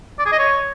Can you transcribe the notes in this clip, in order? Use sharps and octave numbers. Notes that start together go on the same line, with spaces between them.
D5
G#4
D#5
C#5